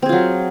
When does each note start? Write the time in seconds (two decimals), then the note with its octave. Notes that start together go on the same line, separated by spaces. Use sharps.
0.02 C4
0.06 G#4
0.09 F4
0.12 F#3